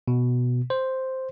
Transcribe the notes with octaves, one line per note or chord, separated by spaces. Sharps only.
B2
C5